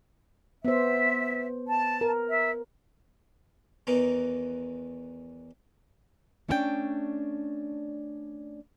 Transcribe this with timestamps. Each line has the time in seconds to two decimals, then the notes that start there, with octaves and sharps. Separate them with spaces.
0.65 B3 C5 E5
1.69 A5
2.01 A#4
2.30 E5
3.87 E2 D#3 E3 A#5
6.48 A3 C#4 D4 E4 D5 G5